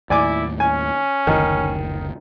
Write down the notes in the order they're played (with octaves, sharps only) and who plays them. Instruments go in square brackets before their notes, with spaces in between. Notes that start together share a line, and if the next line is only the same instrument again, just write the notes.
[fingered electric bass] D#2 A2 [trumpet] E4 [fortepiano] D5 G#5 D6
[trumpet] C#4 [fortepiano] G#5
[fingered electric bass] F#1 D2 [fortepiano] D#3